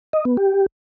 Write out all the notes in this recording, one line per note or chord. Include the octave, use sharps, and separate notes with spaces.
D#5
B3
G4